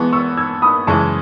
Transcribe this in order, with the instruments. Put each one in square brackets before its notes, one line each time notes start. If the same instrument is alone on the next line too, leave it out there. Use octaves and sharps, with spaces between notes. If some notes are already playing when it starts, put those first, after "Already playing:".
Already playing: [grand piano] E3 G#3 B3 [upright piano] A5 C#6
[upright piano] C#6 E6
E6 G#6
B5 D#6
[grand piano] F#2 C#3 E3 G#3 [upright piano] A5 C#6